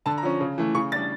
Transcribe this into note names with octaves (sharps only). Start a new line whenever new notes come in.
D3 A5
A#5
F3 C#4
C#3
E3 A3
C#3 C#6
G3 D4 A6